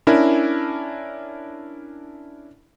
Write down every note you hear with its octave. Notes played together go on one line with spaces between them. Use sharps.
C#4 D4 E4 A#4